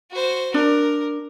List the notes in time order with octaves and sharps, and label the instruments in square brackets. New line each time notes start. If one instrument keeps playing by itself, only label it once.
[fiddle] F#4 C5
[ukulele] D4 [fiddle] A#4